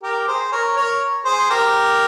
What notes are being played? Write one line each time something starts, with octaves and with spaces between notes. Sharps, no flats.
G4 A#4
G#4 C5
A#4 C#5
A#4 C#5
G#4 C5
G4 A#4